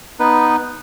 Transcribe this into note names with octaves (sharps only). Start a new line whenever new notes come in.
B3 D#4 B4